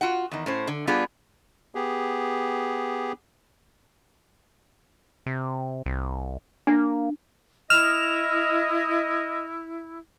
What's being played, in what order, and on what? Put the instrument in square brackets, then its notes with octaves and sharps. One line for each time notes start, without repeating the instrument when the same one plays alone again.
[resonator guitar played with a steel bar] F4 F#4 F#5
E2 D#3
A2 C#4 C5
D3
G3 B3 D4 F4 G4 G#4
[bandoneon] B3 G4 G#4
[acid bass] C3
C2
[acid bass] A#3 [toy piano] D4
[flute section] E4 [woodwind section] D#5 [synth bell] F6 E7 F7